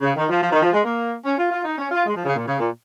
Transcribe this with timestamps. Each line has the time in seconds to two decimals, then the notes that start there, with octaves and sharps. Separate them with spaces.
0.01 C#3
0.15 D#3
0.29 F3
0.42 F3
0.52 D#3
0.62 F3
0.73 G#3
0.84 A#3
1.23 C#4
1.38 F4
1.51 F4
1.64 D#4
1.78 C#4
1.92 F4
2.05 G#3
2.15 F3
2.25 C#3
2.36 A#2
2.46 C#3
2.59 A#2